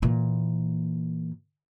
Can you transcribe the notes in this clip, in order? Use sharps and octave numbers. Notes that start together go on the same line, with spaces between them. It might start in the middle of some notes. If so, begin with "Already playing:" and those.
A#2 E3